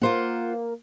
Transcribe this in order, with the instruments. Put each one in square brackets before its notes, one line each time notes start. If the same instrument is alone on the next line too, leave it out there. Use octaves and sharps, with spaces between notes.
[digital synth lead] A#3 [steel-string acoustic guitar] F4 C5 F#5